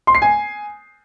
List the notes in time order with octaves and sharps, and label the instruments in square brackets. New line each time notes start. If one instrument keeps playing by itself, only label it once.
[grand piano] C6
C7
G#5